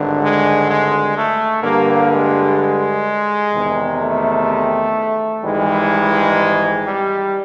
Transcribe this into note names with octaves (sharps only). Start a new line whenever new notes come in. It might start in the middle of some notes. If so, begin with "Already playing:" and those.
Already playing: G#1 G2 D3
G#3
G#3
A3
G2 D3 G3 A#3
G#3
G#3
E2 C3 D#3
A3
G#1 G#2 E3 G3 G#3
G3